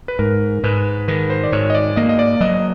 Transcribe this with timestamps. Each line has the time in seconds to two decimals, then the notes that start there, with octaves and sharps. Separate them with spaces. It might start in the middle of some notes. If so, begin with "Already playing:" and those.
0.08 B4
0.19 G#2 A#4
0.64 G#2 B4
1.08 D#3 B4
1.30 C5
1.44 D5
1.52 G#2 C#5
1.70 D#5
1.75 D5
1.96 A#3 D#5
2.09 D#5
2.19 D5
2.41 F#3 D#5